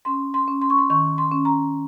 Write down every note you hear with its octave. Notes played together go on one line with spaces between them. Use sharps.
C#4 C6
C6
C#4
C6
C#6
C6
D#3 C#6
C6
C#4
A#5